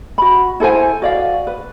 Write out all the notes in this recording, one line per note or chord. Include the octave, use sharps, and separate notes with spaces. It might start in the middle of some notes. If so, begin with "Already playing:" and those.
F#4 B5
E4 A4 C5 G#5
F#4 D5 F5
B4